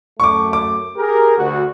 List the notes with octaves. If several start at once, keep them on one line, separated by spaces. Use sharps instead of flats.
F#2 A3 C#6 D6
D6
G4 G#4 A#4
D2 F#4